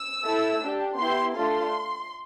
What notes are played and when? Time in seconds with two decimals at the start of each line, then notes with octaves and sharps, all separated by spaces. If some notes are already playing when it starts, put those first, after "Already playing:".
Already playing: E6
0.23 A3 E4 A4
0.61 D4 G4
0.97 B3 E4 G4 C6
1.34 A3 D4 F4 A4 C6